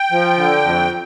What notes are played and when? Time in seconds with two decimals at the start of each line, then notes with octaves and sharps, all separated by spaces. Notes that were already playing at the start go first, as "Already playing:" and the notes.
Already playing: G5
0.12 F3
0.37 D3
0.64 F2